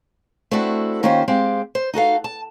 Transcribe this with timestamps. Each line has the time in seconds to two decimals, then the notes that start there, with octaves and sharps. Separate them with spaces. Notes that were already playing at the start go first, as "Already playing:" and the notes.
0.51 A3 C4 D4 E4 F#4 A4
1.03 D#3 A#3 C#4 F4 G4 C5
1.28 G#3 C4 G4 F5
1.75 C5
1.94 D#4 F#4 A4 F5
2.24 A5